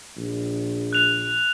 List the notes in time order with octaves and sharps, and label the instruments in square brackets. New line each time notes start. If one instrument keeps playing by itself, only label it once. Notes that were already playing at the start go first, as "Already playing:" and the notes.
[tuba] A#1
[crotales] F#6 F7